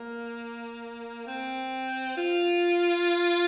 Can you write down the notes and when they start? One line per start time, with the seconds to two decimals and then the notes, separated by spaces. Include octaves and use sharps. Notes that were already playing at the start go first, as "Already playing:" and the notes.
Already playing: A#3
1.27 C4
2.17 F4